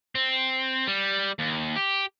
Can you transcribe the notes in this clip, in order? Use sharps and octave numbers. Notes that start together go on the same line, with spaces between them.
C4
G3
D#2
G4